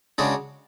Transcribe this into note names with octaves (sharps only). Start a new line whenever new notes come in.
C#3 G#3 D4 F#4